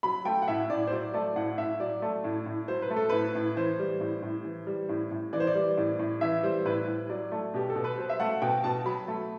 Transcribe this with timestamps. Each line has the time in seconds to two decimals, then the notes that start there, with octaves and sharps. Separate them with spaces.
0.03 F#3 B5
0.25 A3 G5
0.42 F#5
0.48 A2 E5
0.70 A2 D5
0.87 C5
0.92 F#3 D5
1.14 A3 D5
1.36 A2 F#5
1.58 A2 E5
1.80 F#3 D5
2.02 A3
2.24 A2
2.46 A2
2.68 F#3 C5
2.82 B4
2.90 A3
2.96 A4
3.09 A2 B4
3.35 A2
3.56 E3 C5
3.79 G3
4.00 A2
4.22 A2
4.45 E3
4.67 G3
4.89 A2
5.11 A2
5.33 E3 D5
5.40 C5
5.47 D5
5.55 G3
5.77 A2
5.99 A2
6.21 E3 E5
6.43 G3 C5
6.65 A2 B4
6.87 A2
7.09 F#3 D5
7.32 A3
7.54 B2 G4
7.70 A4
7.75 B2
7.84 B4
7.98 F#3 C5
8.09 E5
8.20 A3 F#5
8.42 B2 G5
8.64 B2 A5
8.86 F#3 B5
9.08 A3